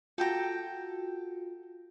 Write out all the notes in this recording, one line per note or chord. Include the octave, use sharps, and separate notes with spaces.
F4 F#4 A4 G5 A#5